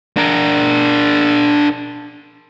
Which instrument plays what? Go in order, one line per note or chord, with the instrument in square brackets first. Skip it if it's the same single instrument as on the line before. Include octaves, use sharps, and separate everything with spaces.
[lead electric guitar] D4 A#4